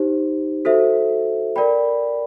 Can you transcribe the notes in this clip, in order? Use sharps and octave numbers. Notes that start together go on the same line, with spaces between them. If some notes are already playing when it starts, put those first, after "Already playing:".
Already playing: D#4 G4 C5
F#4 A4 C5 E5
A#4 D5 G5 B5